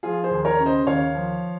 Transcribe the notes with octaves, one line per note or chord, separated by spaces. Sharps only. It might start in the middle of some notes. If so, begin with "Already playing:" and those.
F3 F4 G#4
G#4 C5
D#2
A#4 C#5
C#3
C5 D#5
D#2 C#5 F5
F3